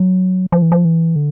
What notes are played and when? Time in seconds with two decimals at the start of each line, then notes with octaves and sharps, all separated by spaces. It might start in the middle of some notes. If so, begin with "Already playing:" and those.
Already playing: F#3
0.52 F3
0.62 E3
0.72 F3
0.85 E3
1.16 D3